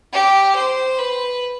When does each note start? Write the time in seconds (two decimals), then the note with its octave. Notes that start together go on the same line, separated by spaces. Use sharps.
0.13 G4
0.55 C5
0.98 B4